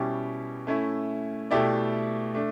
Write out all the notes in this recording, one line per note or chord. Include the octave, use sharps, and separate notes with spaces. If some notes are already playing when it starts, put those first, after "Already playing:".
Already playing: B2 G3 C#4 E4 G4
A3 C#4 E4
B2 A3 E4 G4 D5
A3 D4